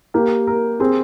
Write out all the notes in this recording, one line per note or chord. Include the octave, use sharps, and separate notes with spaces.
A#3 G4
A#4
C4 G#4